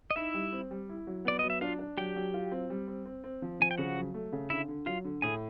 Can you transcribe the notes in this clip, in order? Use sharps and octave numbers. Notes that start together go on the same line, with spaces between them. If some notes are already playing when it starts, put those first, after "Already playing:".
D#5
D#4 E4 E5
G3
C4
G3
E4
F#3
B3 D5
F#3 D#5
E5
D4 F4 F5
D4
F#3 G4 G5
F#3
F4
C4
G3
C4
C4
C4
F3
F3 G#5
G5
C#3 F#4 F#5
F#3
A3
C#3
D3 E4 E5
D3
F#3 F4 F5
D3
A2 G#4 G#5